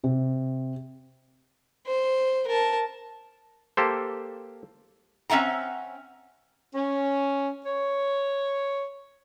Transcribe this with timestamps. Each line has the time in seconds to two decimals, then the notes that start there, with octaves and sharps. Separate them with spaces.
0.04 C3
1.87 C5
2.48 A#4 A5
3.77 A#3 G4 A4 C5
5.30 C4 C#4 E5 F#5 A#5
6.74 C#4
7.66 C#5